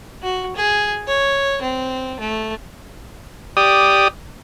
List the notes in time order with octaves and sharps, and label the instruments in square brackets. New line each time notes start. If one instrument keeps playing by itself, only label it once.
[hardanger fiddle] F#4
G#4
C#5
C4
A3
[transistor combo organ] G4 D5 D#6